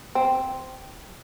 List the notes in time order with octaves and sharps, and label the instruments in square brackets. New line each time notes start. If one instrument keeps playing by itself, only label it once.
[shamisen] C4